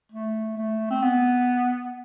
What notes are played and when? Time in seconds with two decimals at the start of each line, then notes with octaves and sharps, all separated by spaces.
0.12 A3
0.57 A3
0.90 C4
1.02 B3